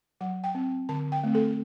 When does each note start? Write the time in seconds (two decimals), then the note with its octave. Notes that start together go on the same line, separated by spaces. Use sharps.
0.21 F#3 F#5
0.44 G5
0.55 C4
0.89 D3 A5
1.12 G5
1.24 A3 C4
1.35 A4